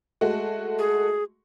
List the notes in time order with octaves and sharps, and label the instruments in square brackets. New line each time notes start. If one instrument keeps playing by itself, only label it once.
[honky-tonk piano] G#3 A3 F#4
[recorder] G#4